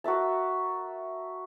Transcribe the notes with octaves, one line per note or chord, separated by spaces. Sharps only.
F#4 A#4 E5 A5